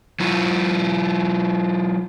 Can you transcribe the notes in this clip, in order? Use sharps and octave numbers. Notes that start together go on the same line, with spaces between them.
F#3 E4 F4